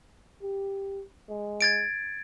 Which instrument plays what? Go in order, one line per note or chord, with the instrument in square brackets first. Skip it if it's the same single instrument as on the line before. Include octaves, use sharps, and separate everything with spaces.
[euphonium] G4
G#3
[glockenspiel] G#6 A6 D7